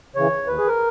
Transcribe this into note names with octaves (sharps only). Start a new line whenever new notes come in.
C#3 E3 C#5
D#2 B4
G#4
A#4